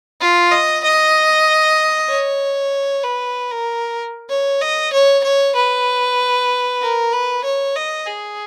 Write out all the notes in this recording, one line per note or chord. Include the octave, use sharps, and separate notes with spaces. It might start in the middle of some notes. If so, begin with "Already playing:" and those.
F4
D#5
D#5
C#5
B4
A#4
C#5
D#5
C#5
C#5
B4
A#4
B4
C#5
D#5
G#4